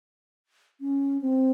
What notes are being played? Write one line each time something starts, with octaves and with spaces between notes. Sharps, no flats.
C#4
C4